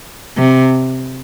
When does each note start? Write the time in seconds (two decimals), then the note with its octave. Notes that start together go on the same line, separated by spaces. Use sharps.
0.37 C3